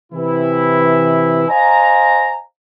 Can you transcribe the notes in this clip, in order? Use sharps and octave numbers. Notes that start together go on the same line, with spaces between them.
C3 E3 E4
C5 D#5 F5 G#5 A#5